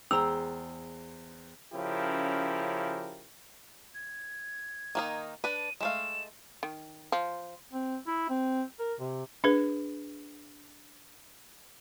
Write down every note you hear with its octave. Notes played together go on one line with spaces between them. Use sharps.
E2 G#4 C5 G5 A#5 E6
C#3 F3 C#4 E4 G4 A#4
G#6
D#3 A#3 D#4
D4 B4 D#7
G#3 A3 F5 E7
D#3
F3
C4
E4
C4
A#4
C3
D4 G#4 B4